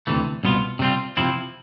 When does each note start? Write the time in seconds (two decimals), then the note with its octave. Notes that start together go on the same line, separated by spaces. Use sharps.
0.07 D2 C3 E3 A3
0.43 C2 B2 B3 F4
0.79 C3 G3 C4 F4
1.17 C3 F3 C4 E4